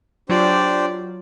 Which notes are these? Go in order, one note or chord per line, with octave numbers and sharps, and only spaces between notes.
F#3 D4 F4 G4 C5 D5